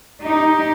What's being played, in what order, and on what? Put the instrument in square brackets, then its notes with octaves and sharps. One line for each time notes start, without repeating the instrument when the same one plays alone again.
[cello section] D#4 [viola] G4